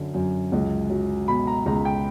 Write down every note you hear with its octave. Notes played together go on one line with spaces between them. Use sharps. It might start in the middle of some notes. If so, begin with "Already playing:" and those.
Already playing: F#2 D3 F#3
F#2
C#2
F#3
B2 B5
A#5
C#2 A#5
G5